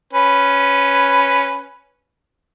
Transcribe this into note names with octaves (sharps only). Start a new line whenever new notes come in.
C#4 B4